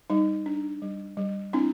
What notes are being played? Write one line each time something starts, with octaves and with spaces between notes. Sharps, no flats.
G3 D#4
D4
G3
G3
C4 D4 E4